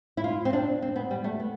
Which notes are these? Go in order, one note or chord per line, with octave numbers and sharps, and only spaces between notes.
E4
F4
C4
D4
C4
B3
G3
A3
B3